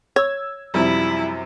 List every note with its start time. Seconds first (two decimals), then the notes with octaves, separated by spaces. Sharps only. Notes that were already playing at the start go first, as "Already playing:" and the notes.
0.16 C#5 E6 G#6
0.74 F#2 C3 F3 G3 C4 E4